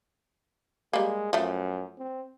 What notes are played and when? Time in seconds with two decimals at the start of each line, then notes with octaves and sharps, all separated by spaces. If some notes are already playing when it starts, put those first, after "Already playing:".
0.93 G3 G#3 A#3
1.33 F#2 F3 A3
1.98 C4